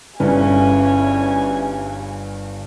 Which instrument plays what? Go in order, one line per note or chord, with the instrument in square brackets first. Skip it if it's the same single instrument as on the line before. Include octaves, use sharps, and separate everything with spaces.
[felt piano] G1 G2 B4 [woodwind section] C#3 E3 C#4 [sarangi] G#5